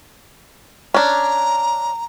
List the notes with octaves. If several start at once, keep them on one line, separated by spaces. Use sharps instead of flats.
C#4 D4 A#5